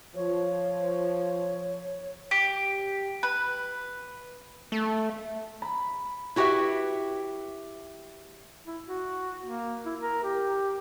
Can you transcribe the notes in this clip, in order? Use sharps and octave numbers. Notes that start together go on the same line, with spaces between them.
F3 C#5
G4
B4
A3
B5
E4 F#4 G4 B4 E5
E4
F#4
A#3
E4
A#4
G4